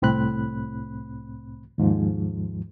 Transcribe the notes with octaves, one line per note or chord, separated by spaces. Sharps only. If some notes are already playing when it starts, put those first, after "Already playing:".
C2 A2 C4 B5 F#6
D#2 G#2 F3